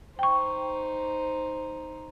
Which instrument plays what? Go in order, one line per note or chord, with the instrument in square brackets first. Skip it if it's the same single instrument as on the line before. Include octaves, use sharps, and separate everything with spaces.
[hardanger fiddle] D#4 C5 [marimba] G5 C#6